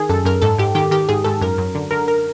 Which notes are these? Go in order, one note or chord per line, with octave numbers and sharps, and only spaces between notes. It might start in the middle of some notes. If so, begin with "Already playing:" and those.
Already playing: D#3 G#4
F#2 A4
F#2 A#4
G#2 A4
G#2 G4
D#3 G4
D#3 G4
G#2 G#4
G#2 A4
F#2 A#4
F#2
D3
D3 A#4
A#4